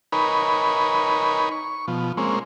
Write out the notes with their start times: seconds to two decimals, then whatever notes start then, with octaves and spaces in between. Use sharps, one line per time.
0.12 D#4 A#4 B4 C#5 G#5 B5
1.52 C#6
1.88 B2 F3
2.17 G#3 A#3 C4 C#4